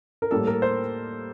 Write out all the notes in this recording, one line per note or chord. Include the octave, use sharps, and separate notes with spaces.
A#4
A2 G3 A#3 A4
A#4
C5